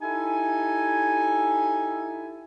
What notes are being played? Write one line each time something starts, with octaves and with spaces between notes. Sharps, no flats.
D#4 E4 G4 A4 E5 G#5